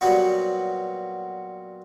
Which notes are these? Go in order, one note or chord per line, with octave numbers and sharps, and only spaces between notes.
A#2 F#3 G3 B3 F#4